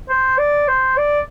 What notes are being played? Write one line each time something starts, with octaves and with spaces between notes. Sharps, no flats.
C5
D5
C5
D5